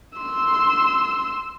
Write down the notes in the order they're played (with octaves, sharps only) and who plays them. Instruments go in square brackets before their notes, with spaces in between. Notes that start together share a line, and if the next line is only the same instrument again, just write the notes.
[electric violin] C6 E6